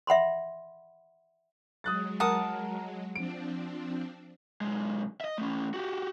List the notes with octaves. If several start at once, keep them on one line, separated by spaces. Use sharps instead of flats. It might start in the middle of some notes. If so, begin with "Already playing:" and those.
E5 F#5 B5 C6
F#3 G#3 D#6 F#6 A6
A#4 F#5 A5 A#5 D#6
F3 C4 D4 D7
B1 G#3
D#5 E5
A3 C#4
F#4 G4